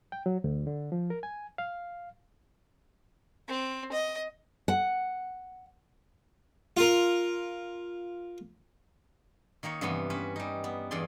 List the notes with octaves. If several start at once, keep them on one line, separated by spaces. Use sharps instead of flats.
G5
F#3
D2
D3
F3
A#4
G#5
F5
C4
D#5
F#5
F4 A#4
D#3 A#3 D#4 C#5
G2 C3 E3 B3 G#5
C#4 B4 C5
G3 D#4
B3
E2 G2 G#4 D5 C6